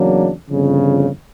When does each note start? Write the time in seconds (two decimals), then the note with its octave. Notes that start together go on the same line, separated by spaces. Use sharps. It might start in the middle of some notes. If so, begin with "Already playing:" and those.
Already playing: E2 C#3 F#3 A#3 D4
0.48 G1 F2 C#3